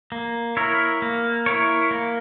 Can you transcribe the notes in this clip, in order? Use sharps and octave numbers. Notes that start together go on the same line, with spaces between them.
A#3
E4 A#4 C#5
A#3
E4 A#4 C#5
A#3